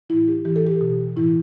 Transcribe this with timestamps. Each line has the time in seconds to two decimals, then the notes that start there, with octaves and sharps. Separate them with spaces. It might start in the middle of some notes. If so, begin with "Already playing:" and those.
0.10 A2 E3 E4
0.28 G4
0.45 A2 E3 G4
0.56 A4
0.67 G4
0.81 B2
1.16 A2 E3 E4